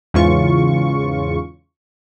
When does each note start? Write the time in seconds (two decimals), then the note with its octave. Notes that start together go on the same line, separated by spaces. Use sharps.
0.14 E2 G#2 C#3 E3 F4 C#6